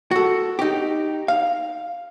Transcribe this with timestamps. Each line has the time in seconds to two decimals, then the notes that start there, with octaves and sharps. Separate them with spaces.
0.11 F#4 A4
0.59 D#4 G4
1.28 F5